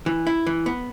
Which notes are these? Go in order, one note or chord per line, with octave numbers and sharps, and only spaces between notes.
E3
E4
E3
B3